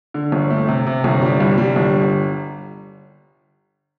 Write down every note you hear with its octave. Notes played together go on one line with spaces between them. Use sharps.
D3
G1
A3
C3
C3
G1
G3
C2
G3
G1